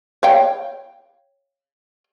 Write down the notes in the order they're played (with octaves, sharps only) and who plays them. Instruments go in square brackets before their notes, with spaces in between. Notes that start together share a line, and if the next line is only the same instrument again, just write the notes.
[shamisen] C#5 F5 G5